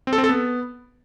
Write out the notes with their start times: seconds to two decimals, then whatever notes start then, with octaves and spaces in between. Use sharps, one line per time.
0.07 C4
0.13 A4
0.18 C4
0.24 A4
0.29 B3